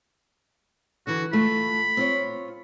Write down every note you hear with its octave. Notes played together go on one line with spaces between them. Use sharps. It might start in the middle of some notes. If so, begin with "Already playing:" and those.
D3 E3 F#4
A3 F4 B5
C4 F4 C#5